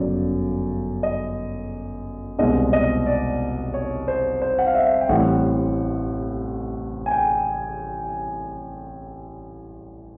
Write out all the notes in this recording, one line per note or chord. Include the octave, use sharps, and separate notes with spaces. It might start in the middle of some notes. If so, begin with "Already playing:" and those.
Already playing: G1 F#2 C#3 F#3 D5
D#5
C2 B2 G#3 C4 D#5
D#5
D5
C#5
C5
C5
F#5
F5
E5
G5
A1 A2 E3 G3 C4 F#5
G#5
G5